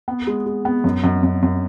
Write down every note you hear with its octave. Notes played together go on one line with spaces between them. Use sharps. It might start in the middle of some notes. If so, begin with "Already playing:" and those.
B3
G#3
G#3
B3
F#2
F#2
F#2
F#2